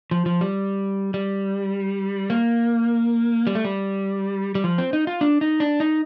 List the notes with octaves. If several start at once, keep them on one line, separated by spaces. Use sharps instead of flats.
F3
F3
G3
G3
A#3
G3
A3
G3
G3
F3
C4
D#4
F4
D4
D#4
D4
D#4